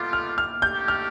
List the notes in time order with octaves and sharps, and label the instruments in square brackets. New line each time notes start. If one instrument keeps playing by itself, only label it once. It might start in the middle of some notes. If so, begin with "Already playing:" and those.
Already playing: [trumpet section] G3 B3 F4 A4 [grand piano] D6
[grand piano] F6
F6
[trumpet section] A3 D4 G4 [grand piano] G6
[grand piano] F6